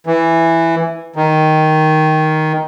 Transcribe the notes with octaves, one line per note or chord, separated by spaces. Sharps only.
E3
D#3